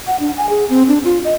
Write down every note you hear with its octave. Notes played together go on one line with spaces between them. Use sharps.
F#5
D4
G#5
G#4
C4
D4
F4
D#5